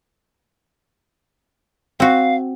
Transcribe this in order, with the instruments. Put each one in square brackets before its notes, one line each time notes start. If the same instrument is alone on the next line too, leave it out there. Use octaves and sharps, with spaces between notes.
[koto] C4 F#4 [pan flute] F5